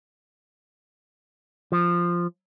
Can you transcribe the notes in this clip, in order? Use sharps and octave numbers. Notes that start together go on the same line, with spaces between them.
F3